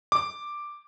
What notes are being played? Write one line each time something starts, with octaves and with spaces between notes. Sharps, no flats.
D6